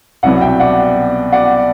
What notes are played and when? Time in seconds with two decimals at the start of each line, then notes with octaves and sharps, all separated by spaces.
0.23 C2 B2 F#3 B3 D5 F#5
0.41 E5 G5
0.60 D5 F#5
1.32 D5 F#5